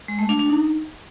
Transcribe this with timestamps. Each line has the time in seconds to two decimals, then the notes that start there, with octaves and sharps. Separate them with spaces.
0.08 G#3
0.19 A3
0.29 D4
0.39 D4
0.50 D#4